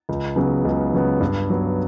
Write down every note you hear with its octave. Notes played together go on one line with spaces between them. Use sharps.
C#2
C#3 F#3 B3
C#2
C#3 F#3 B3
G2
F#3 B3